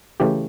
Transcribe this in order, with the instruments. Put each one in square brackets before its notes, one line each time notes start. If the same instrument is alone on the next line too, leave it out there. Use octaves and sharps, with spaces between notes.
[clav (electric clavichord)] C#3 E3 A3 G4